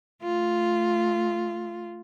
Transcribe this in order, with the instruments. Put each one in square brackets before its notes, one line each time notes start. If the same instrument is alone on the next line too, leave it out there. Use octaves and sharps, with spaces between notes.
[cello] A3 F4